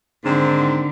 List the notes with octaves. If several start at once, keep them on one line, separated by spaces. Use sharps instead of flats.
G#2 D3 D#3 C4